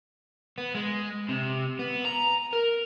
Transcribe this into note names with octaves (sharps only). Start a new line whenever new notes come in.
B3
G#3
C3
B3
A#5
A#4